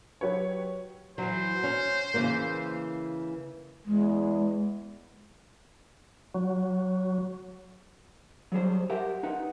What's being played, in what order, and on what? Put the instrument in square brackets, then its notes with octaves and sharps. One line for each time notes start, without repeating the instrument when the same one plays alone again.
[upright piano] F#3 G4 B4 C#5
[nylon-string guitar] E3 F#3 [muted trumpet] C5
[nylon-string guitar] C#4
C#3 E3 A#3
[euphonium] E2 [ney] G#3
[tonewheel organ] F#3
[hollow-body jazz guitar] F#3 G3 G#4 C5
G4 A#4 E5 F#5
D#4 B4 F#5